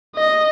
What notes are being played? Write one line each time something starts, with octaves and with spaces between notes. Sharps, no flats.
D#5